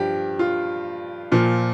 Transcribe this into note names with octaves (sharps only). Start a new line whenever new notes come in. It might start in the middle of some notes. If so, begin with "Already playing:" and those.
Already playing: G2 F3 G4
F4
A#2 F3